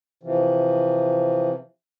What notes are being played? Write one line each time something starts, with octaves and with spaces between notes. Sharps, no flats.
C3 E3 F3